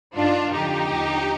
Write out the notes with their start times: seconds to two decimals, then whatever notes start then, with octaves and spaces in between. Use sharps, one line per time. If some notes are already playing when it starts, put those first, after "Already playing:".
0.15 G2 D#3 D4 F4
0.52 F2 D3 F3 D#4 G4
0.90 D#2 D3 F3